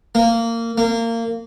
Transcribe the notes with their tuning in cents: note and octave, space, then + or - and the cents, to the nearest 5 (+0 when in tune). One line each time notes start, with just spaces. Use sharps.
A#3 -20
A#3 -25